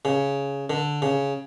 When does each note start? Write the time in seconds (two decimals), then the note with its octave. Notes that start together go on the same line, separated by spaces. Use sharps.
0.05 C#3
0.70 D3
1.02 C#3